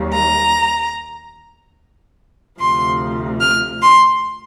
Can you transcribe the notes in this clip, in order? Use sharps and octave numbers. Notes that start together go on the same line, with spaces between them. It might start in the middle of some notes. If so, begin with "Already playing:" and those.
Already playing: D#2 D#3 G3
A#5
D2 C3 F3 C6
F6
C6